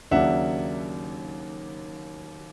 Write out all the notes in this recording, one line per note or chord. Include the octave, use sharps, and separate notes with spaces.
D#2 C#3 F#3 A#3 D4 E5 F#5